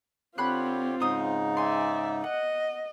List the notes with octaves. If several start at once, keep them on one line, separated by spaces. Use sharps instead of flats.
D3 C4 F4 G4 C#5 B5 C6 F#6
G#2 C#3 D#4 C5 D#6
D5 E5 G#5 C6
D#5 F#5